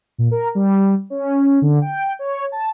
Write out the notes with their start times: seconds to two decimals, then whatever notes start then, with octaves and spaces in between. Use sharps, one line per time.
0.18 A#2
0.31 A#4
0.55 G3
1.10 C#4
1.62 D3
1.82 G5
2.19 C#5
2.52 A5